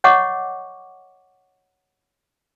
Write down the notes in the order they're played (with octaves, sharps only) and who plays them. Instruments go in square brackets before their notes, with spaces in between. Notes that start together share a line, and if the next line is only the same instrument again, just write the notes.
[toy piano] C#5 D#5 F#5 C#6 D6